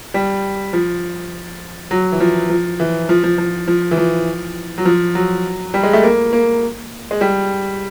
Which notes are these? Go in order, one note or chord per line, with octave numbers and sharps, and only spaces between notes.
G3
F3
F#3
E3
F3
F3
E3
F3
F3
F3
F3
E3
F3
F#3
F3
F#3
G3
G#3
A3
A#3
A#3
G#3
G3